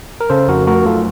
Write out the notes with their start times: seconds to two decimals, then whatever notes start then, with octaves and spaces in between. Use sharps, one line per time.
0.21 A#4
0.30 C#3 A4 C5
0.48 F2 F#4 A#4
0.67 A3 F#4 A#4
0.86 F#2 F4 A4